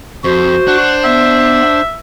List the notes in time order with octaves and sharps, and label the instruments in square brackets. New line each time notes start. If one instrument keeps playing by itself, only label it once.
[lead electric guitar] F2 [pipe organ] F#4 [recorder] C5
[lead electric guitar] D4 [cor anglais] F#5
[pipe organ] B3 [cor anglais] E5